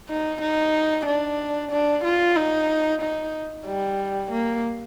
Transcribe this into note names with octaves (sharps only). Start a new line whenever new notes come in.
D#4
D#4
D4
D4
F4
D#4
D#4
G3
A#3